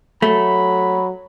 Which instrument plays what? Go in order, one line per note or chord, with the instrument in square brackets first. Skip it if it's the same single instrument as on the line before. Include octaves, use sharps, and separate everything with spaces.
[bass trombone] F#3 [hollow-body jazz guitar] A3 [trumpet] B5